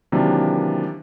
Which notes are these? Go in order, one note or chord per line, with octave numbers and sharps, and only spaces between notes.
C3 D#3 E3 F#3 A#3 D4